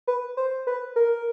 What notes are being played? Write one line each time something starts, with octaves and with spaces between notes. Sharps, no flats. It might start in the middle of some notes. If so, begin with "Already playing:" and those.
B4
C5
B4
A#4